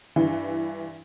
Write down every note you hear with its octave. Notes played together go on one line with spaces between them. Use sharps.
G2 E3